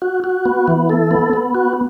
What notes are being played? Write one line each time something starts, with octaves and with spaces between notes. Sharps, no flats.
F#4
F#4
B3
E3
A4
B3
B3
F#4